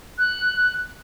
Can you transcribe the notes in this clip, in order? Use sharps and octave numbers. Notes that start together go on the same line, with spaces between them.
F#6